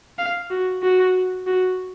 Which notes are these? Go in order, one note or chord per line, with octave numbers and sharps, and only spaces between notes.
F5
F#4
F#4
F#4